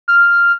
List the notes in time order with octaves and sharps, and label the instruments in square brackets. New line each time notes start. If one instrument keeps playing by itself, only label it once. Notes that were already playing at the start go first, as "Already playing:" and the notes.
[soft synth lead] F6